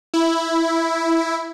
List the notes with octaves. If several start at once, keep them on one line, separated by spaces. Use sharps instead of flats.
E4